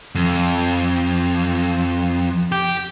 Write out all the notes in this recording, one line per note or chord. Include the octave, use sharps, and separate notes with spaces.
F2
G4